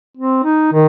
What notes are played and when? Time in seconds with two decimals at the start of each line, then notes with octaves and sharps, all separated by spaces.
0.17 C4
0.44 D#4
0.73 D#3